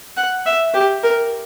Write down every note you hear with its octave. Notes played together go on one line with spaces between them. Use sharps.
F#5
E5
G4
A#4